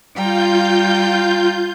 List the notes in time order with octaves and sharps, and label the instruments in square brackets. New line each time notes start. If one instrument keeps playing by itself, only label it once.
[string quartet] G3 G5 A#5 [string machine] F4 G6